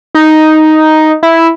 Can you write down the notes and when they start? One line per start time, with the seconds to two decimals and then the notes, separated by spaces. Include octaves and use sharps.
0.15 D#4
1.23 E4